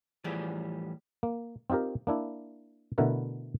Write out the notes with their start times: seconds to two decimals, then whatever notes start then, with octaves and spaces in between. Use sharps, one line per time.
0.24 A2 E3 F3 G3 G#4 D5
1.23 A#3
1.70 C4 D#4 F4 G4 A#4
2.07 A#3 D4 E4
2.98 B2 D3 A3 E4 A#4 B4